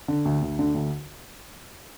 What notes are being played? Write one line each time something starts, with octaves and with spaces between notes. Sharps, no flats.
D3
D2
D2
D3
D2